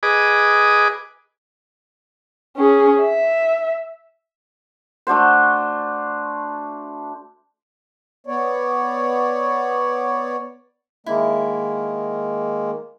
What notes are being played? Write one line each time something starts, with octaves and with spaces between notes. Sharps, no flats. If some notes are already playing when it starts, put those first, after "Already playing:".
G#4 B4 D#5 D6
C#4 G#4
E5
A3 D4 F#4 C5
B3 C#5 D5
D#3 G#3 A#3 E4